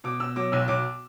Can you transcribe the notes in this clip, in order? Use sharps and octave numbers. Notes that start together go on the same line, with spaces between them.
B2 D6
B2 E6
F#3 D6
B1 E6
B1 D6